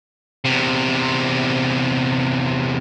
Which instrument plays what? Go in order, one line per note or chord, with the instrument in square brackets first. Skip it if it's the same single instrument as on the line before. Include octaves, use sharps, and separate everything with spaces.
[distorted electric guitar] E2 C3